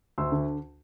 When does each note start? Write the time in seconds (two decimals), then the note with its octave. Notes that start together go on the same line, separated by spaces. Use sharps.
0.18 D2 C6 E6
0.32 D3